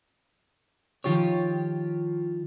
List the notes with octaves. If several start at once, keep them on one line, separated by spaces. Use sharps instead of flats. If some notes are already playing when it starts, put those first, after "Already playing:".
D#3 F3 F4 G4 C#5